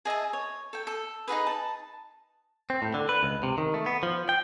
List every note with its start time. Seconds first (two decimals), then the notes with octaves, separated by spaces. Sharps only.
0.05 G#4 D#5 E5 A5
0.33 C#5
0.73 A4 G5
0.87 A4
1.28 D#4 F#4 G#4 B4
1.47 A5
2.70 C4
2.82 A2
2.94 D3
3.09 B4
3.23 C#2
3.43 C3
3.58 D#3
3.74 A3
3.86 B3
4.03 F3
4.29 G5